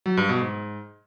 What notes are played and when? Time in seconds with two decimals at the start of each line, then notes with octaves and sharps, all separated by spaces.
0.06 F#3
0.17 G2
0.29 B2
0.41 G#2